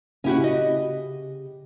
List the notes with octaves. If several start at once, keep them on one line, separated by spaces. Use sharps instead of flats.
C#3 C#4 E4 F#4 G4
D#5